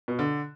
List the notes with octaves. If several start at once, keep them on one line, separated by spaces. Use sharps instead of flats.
B2
D3